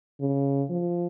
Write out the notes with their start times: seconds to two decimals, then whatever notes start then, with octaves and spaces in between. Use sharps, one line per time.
0.20 C#3
0.70 F3